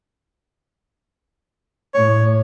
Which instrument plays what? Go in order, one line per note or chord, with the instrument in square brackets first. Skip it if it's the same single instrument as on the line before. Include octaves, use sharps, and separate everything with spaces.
[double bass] A2 [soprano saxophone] C#5